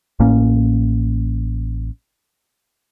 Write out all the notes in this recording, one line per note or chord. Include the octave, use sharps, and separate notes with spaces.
A1 A2 A#3 C#4